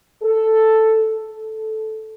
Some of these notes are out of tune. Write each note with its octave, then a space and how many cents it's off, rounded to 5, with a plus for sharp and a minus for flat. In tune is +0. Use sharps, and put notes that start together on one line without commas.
A4 +0
A4 -10